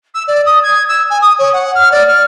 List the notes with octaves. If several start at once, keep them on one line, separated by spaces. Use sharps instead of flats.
E6
D5
D#6
G#6
E6
G#5
D#6
C#5
F#5
F6
D5
F6